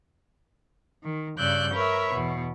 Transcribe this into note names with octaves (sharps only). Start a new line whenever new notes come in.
D#3
G2 C#3 D5 E6 F#6 G6
A#4 B4 C#5 E5
E2 B2